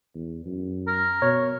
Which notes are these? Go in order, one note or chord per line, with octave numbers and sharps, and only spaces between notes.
E2
F#2
A#4
B2 C#5